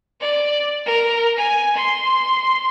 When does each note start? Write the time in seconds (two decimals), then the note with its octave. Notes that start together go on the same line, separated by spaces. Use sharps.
0.21 D5
0.85 A#4
1.37 G#5
1.76 C6